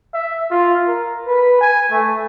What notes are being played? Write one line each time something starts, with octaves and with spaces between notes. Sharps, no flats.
E5
F4
A#4
B4
G#5
A3